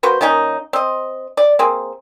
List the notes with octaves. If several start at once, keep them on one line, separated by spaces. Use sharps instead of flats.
A#3 F#4 B4 C5
D#3 A#3 C#4 D#4
C4 D#5
D5
A#3 C4 G#4